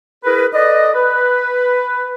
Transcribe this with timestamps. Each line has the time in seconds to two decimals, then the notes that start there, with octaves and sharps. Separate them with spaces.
0.24 E4 G#4 A#4 B4
0.53 A4 B4 D5 D#5
0.95 B4